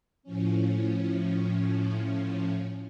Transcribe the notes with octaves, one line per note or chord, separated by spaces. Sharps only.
A2 F3 C#4